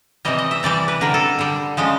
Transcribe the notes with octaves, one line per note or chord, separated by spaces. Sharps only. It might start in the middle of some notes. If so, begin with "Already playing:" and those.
C3 E3 G3 D#5
D#5
E5
C3 E3 G3 D5
B4
D3 G3 A#4
A4
D3 G3
C#3 F3 G#3